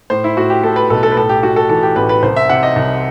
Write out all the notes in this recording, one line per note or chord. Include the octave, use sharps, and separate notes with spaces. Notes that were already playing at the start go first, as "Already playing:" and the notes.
A2 C5
E4
A2 F#4
G4
A2 A4
B4
B1 A4
A4
B4
A2 A4
G4
A2 F#4
A4
E3 A4
G4
A1 B4
B4
C2 C5
E5
C3 F#5
D#5
C2